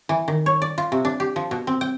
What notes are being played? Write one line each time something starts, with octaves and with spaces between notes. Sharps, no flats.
E3
D#3
C#5
D5
F4
C3
D4
G4
F3
B2
C4
G5